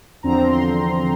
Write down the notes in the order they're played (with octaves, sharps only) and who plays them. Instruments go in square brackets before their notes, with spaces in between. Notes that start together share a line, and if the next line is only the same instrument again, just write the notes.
[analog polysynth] E2 D3 F3 C4 A#5
C6